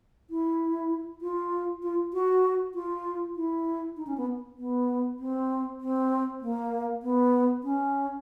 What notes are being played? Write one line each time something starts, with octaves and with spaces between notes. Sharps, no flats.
E4
F4
F4
F#4
F4
E4
D#4
C#4
B3
B3
C4
C4
A#3
B3
C#4